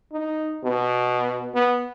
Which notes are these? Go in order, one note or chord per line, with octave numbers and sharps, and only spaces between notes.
D#4
B2
B3